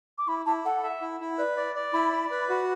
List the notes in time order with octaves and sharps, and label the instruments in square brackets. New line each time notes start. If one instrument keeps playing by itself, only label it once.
[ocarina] D6
[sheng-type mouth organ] E4 [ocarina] B5
[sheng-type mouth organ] E4 [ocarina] A5
[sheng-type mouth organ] A4 [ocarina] F#5
[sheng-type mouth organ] E5
E4
E4
[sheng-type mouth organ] B4 [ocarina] D5
[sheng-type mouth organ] D5
D5
[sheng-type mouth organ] E4 [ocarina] B5
[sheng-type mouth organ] D5
B4
F#4